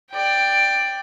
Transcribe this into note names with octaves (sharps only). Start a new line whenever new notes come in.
D5 G5